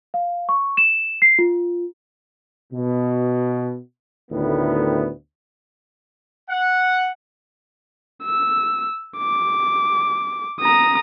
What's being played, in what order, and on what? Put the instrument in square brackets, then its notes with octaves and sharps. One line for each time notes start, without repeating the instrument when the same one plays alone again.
[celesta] F5
C#6
E7
C7
F4
[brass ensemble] B2
D2 A2 D#3 B3
[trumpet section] F#5
[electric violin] E6
D6
A#5 D#6